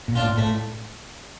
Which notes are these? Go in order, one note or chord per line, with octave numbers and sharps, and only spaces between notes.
A#2
D4 F4
A2
A2 A3